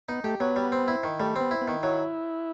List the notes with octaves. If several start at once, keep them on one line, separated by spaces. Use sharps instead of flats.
B3 D#4
A3 G4
F#3 B3
G3
C4
E4
D#3
G3 A3
B3 C4
E4
B3
D#3
F#3 E4